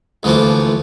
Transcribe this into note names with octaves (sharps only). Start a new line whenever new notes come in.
D2 E3 F3 A3 A#3